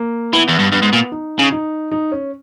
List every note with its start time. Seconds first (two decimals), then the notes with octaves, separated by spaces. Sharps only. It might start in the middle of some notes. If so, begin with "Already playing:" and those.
Already playing: A#3
0.33 E3 B3
0.48 E2
0.60 G2
0.72 G2 B3
0.82 G#2
0.93 A#2
1.12 D#4
1.39 C#3
1.52 D#4
1.91 D#4
2.12 C#4